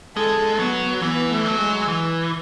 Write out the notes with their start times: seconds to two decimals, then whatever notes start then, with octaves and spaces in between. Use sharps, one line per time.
0.17 G#3 A4
0.59 F#3 B3
1.02 E3 B3
1.31 A3
1.46 F#3
1.59 G#3
1.88 E3